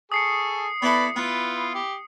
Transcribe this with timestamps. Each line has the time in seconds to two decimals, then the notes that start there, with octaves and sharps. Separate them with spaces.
0.12 G#4 A4 C#6 D#6 C7 C#7
0.82 B3 E4 A4 B4 D5 B5
1.16 B3 E4 F4 B4
1.74 G4